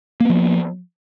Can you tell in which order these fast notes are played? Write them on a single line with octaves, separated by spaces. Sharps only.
A#3 B3 F3